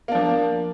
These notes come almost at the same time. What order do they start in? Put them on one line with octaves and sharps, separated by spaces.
A#3 D4 F3